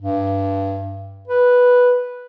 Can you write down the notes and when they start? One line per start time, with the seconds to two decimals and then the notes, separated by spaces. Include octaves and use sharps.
0.01 G2
1.28 B4